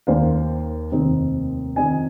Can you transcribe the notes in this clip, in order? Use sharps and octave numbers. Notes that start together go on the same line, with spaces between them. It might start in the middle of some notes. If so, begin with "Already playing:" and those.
D#2 D#3 A#3 C5 F5
F1 D#2 D#3 C4 D#4
F2 D#3 C4 D#4 D#5 G#5